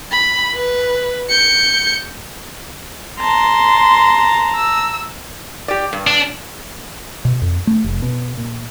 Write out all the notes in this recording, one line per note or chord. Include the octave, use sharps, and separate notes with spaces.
B5
B4
G6 C#7
A5 A#5 C6
E6
G4 D5
G2
D4
B2
F2
A3
F1
B2
A#2